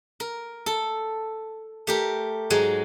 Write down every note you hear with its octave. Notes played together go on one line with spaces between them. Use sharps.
A#4
A4
A3 G4 A#4
G#2 F#3 G#3